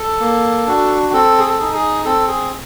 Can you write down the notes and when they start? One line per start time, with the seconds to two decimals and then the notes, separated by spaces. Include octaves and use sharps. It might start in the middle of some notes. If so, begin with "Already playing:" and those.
Already playing: A4
0.20 A#3
0.67 D4 F#4
1.13 C4 A4
1.40 G#4
1.44 A4
1.59 D#4 G#4
1.74 G#4
2.05 C4 A4
2.28 G#4